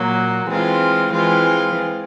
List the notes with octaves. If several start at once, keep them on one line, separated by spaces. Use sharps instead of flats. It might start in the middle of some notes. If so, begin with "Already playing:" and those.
Already playing: A#2 F#3 A#3
E3 G#3 C4 F4
E3 G#3 C4 F4